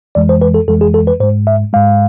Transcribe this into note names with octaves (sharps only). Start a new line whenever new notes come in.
F2 E3 G#3 D5
C5
B4
A4
F2 E3 G#3 A4
G#4
A4
B4
G#2 G#3 C5
E5
G#2 G#3 F5